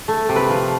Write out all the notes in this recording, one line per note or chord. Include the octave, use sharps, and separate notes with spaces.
A3
C3
B4
F3